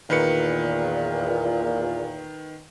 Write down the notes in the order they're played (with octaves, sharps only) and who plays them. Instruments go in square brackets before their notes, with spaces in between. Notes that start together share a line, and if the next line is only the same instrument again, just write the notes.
[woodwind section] E2 A#2 [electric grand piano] D#3 B4 C#7